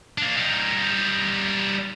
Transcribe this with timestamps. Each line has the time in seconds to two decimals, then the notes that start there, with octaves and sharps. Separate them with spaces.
0.18 A#3 D4
0.36 G3 D#4